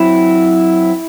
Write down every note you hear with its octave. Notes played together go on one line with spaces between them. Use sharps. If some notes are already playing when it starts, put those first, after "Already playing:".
Already playing: F#3 C4 E4